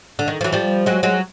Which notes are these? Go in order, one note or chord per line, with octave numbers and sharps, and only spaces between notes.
D3
D#3
F3
E3 F#3
F3 G3
F#3 G#3
F#3 G#3